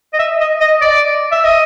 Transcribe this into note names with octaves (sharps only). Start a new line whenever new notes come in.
D#5
E5
D#5
D#5
D5
E5
D#5